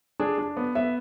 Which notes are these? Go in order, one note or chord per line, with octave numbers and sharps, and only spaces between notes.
D4 G#4
D4
B3
B3 E5